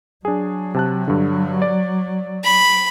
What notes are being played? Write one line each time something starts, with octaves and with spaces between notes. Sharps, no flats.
F#3 D4 G#4
C3 A5 F#6
G2 D3
D5
B5